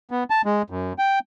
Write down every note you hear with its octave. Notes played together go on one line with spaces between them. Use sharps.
B3
A5
G#3
F#2
G5